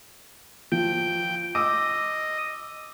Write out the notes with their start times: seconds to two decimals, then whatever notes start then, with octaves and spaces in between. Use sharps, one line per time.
0.72 F3 G5
1.55 D#5 D6 E6